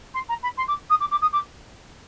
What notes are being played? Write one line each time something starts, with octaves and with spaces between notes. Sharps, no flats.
C6
A#5
B5
C6
D6
D#6
D6
D6
D#6
D6